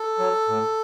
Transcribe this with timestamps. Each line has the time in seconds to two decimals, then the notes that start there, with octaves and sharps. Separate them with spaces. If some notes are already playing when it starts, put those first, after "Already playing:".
Already playing: A4
0.19 F#3
0.48 A2